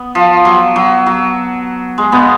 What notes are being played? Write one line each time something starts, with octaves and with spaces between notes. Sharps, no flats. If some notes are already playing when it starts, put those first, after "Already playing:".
Already playing: B3
F3
F#3
F#3
F#3
G#3
B2 B3